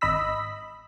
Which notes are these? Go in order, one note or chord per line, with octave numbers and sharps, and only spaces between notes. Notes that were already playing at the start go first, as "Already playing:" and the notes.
G#1 D#5 B5 E6 B6